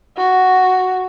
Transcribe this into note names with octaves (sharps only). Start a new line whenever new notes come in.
F#4